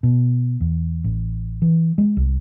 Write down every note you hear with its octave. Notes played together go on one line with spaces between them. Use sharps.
B2
E2
A1
E3
G#3
C2